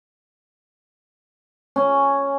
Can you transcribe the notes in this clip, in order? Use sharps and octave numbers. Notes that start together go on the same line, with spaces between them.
C#4